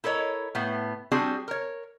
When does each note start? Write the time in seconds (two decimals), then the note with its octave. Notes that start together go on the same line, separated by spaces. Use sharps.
0.04 E4 A4 A#4 C#5 D#5
0.55 A2 B3
1.11 G3 C4 D4 F#4 G#4
1.48 A#4 C#5